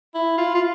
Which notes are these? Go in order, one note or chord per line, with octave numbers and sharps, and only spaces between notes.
E4
F4
F4